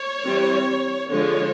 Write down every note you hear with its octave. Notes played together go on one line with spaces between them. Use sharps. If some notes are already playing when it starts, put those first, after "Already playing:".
Already playing: C#5
E3 G3 C4
D3 F3 G#3 C#5